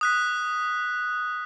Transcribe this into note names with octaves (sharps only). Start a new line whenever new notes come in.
D#6 F#6 B6